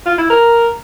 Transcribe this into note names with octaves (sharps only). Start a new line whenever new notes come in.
F4
E4
A#4